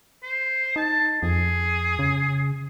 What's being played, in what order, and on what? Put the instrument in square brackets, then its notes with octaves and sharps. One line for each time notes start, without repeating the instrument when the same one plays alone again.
[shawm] C5
[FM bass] D#4 [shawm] A5
[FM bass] F2 [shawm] G#4
[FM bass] C#3